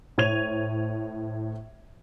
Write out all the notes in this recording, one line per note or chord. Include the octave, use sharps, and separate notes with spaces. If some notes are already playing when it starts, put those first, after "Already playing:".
A2 C5 C#5 G#6 D#7 F7